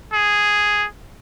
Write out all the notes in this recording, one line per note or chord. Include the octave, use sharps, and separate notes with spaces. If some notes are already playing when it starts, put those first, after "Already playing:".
G#4